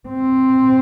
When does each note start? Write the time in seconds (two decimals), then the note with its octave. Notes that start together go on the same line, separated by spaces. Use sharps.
0.08 C4